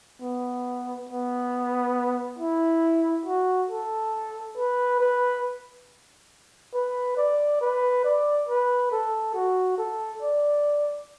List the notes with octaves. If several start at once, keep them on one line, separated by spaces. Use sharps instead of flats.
B3
B3
E4
F#4
A4
B4
B4
B4
D5
B4
D5
B4
A4
F#4
A4
D5